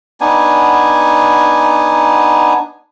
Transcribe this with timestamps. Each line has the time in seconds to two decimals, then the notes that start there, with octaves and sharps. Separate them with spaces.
0.21 B3 D4 D#4 G#5